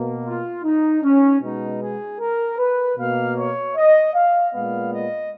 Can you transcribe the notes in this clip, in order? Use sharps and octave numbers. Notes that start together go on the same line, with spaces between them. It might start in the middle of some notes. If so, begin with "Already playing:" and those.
Already playing: B2 A#3
F4
D#4
C#4
B2 G#3 B3 D#4
G#4
A#4
B4
B2 A#3 F5
C#5
D#5
F5
A#2 G#3 B3 F5
D#5